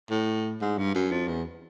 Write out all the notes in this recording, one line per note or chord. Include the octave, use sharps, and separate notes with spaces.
A2
G#2
G2
F#2
F2
E2